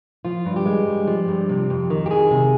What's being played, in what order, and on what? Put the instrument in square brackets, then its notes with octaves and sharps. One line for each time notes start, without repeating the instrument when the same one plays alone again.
[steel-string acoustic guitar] F3 F4
G2
G4
G#3
G2
F3
G2
C3
F2
D#3
G4
F2 G#4
C3